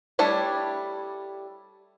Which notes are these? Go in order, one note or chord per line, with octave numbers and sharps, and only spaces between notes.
G3 A3 D4 E4 C#5